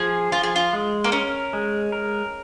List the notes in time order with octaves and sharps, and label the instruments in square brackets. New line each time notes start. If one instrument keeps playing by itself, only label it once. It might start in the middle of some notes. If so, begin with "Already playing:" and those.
Already playing: [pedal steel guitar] F3 [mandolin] G#4
[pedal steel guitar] F3 [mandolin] F4
[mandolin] G#4
F4
[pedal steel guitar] G#3
[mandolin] A#3
[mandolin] C#4 [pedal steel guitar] A#4
[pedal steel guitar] G#3
A#4